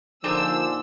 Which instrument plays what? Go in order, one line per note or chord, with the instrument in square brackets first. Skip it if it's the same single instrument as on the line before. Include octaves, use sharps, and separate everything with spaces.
[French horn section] A#2 D3 F3 [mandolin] D4 G#4 C5 [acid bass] D#4 [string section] E6